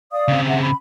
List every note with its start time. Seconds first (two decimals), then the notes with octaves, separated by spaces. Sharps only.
0.12 D5 F5 D#6
0.28 C#3 C4
0.46 G#4 E5 F#5
0.62 B5